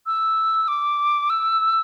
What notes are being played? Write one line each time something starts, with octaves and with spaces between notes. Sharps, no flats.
E6
D6
E6